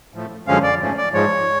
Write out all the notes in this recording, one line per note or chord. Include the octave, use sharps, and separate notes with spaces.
A2 F3 A3
F#2 D3 F3 G#3 C#4 F5
D5
G#2 F3 A3 C#4
D5
G#2 F3 G#3 C#5